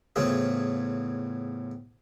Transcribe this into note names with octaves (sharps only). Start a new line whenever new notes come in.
E2 A2 C#3 C4 F4 G#4